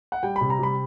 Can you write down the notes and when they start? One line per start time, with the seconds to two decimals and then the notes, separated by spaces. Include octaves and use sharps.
0.12 F#5
0.23 G3 G5
0.36 B5
0.41 C3
0.50 A#5
0.59 G3 B5